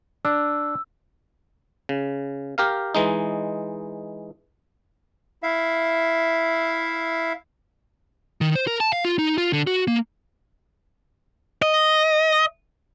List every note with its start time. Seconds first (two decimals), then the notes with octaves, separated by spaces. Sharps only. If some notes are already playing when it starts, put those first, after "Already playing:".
0.25 D4 E6
1.89 C#3
2.58 G4 A#4 F5
2.95 E3 G#3 D#4
5.43 E4 E5 F5
8.41 D#3
8.55 C5
8.67 A#4
8.80 A5
8.93 F5
9.05 F4
9.19 D#4
9.38 F4
9.53 D3
9.67 F#4
9.88 A#3
11.62 D#5